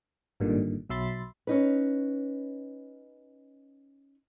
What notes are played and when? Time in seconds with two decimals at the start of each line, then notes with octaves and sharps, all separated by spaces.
0.40 G#1 G2 A#2 D3 D#3
0.90 B1 F#3 E5 B5 C6 A6
1.47 C#4 D#4 B4